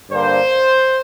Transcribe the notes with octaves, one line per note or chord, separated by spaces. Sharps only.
G2 D3 A#3 C5